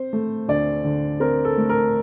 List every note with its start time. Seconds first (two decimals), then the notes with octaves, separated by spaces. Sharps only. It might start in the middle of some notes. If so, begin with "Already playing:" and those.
Already playing: C4 C5
0.13 A3
0.48 D2 D5
0.85 D3
1.20 C4 A#4
1.45 A4
1.57 A3
1.70 A#4